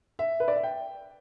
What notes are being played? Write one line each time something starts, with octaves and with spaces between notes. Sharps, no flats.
E5
B4
D5
E5
G5